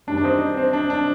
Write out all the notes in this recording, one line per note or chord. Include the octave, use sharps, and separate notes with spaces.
F#2 D#3 G3 D4
D4
C4 D#4
C4
D4
D4